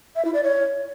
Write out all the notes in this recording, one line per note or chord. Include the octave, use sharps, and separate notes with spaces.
E5
E4
D5
C#5